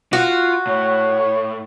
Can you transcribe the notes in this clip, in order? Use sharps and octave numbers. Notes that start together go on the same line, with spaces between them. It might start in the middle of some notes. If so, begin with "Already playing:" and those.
F4 F#4
A2 C#5